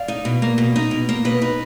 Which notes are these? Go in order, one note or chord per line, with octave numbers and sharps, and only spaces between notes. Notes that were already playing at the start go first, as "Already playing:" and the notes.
Already playing: D5 F5
D#4
B2
A#3
B2
D#4
B2
A#3
B2 B4 D#5
D#4